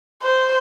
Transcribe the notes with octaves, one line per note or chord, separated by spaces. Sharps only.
C5